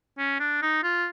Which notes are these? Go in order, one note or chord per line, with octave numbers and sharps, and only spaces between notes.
C#4
D4
D#4
F4